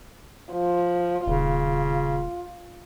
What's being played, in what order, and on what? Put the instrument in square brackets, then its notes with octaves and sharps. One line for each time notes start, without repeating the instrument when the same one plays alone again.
[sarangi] F3
[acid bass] D#1 [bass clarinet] C#3 [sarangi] F4